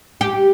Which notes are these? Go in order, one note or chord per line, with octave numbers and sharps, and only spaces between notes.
G4